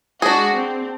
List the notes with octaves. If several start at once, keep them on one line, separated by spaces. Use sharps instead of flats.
G#3 D4 F#4 G#4
C4